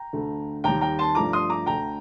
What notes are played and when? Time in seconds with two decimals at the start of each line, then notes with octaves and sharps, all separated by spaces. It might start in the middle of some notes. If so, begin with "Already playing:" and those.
Already playing: G5 A#5
0.13 D2 D3 A3
0.64 D#2 D#3 G3 G5 A#5
0.81 G5 A#5
0.99 A5 C6
1.15 G2 F3 A3 A#5 D6
1.33 C6 D#6
1.50 A#5 D6
1.66 D2 D3 A3 G5 A#5